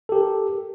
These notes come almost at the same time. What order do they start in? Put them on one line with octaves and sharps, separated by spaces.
A4 G4 A#4